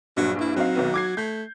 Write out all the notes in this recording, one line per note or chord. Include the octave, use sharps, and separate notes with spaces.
A#1 G2 F#3
E4
F#3 C4 D#4 F5
B1 D#3 B3
D6 G#6 C7
A3 G6